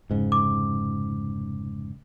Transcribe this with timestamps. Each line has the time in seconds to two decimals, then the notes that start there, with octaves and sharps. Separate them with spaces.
0.10 F1 G#2 C#3
0.32 D6